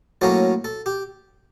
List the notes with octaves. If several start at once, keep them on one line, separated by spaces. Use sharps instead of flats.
A2 F#3 A#3 C#4 A4
A4
G4